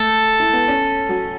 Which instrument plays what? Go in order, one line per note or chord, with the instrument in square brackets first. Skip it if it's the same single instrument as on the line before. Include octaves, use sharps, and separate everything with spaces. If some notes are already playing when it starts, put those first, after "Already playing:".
Already playing: [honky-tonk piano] A3 [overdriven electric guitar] A4
[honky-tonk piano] E4
B3
C#4
F#3